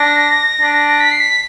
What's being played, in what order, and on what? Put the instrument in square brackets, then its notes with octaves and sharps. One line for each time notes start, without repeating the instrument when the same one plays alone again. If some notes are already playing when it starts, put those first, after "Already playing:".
Already playing: [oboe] D4 [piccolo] A#6
[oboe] D4
[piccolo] B6
C7
B6